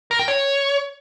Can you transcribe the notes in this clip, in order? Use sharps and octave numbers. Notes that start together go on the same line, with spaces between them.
A#4
G5
C#5